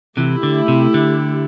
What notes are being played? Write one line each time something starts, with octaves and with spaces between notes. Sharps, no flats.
C3 E3 A3 E4 G4
D3
C3
D3